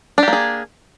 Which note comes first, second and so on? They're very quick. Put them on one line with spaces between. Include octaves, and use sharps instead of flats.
D4 G4 A#3 G#4